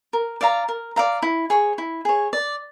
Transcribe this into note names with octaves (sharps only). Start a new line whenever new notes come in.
A#4
D5 F5 A#5
A#4
D5 F5 A#5
E4
G#4 C#5
E4
G#4 C#5
D5